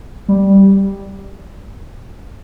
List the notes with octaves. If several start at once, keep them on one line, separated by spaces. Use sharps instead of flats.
G3